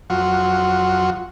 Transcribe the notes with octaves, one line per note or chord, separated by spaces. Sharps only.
F2 F#3 F4 F#4